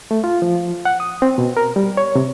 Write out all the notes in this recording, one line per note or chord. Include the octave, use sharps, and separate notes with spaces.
A3
F4
F3
F#5
D#6
C4
B2
A#4
G3
C#5
C3